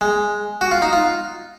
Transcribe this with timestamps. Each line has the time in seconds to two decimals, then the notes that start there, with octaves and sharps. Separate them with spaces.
0.01 G#3
0.61 F#4
0.71 F4
0.82 D#4
0.93 F4